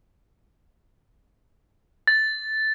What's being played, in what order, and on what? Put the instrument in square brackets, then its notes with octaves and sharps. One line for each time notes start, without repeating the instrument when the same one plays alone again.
[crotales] A6